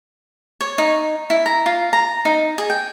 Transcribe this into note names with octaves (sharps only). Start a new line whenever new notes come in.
C#5
D#4
E4
A#5
F4
A#5
D#4
G#4
G5